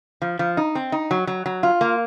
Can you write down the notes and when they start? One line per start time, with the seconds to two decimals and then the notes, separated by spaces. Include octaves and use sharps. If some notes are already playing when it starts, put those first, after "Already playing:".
0.22 F3
0.39 F3
0.57 D#4
0.75 C4
0.92 D#4
1.11 F#3
1.27 F#3
1.46 F#3
1.63 F4
1.81 A#3